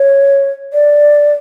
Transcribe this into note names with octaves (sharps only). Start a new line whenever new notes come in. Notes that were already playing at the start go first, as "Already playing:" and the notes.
Already playing: C#5
D5